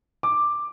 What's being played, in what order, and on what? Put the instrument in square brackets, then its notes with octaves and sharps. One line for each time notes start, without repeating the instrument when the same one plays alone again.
[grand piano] D6